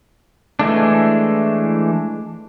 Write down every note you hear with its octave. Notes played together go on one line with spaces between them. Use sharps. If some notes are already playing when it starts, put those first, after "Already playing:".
E3 G#3 A3 D4